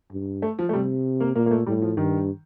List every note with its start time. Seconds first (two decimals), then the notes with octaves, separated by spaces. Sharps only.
0.12 G2
0.42 A3
0.59 F3
0.69 A3
0.73 C3 G3
1.20 A#3
1.35 A#2 A#3
1.46 A#3
1.51 A3
1.66 A2 G3
1.82 F3
1.97 G2 D#3